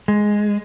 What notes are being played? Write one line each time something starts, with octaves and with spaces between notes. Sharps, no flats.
G#3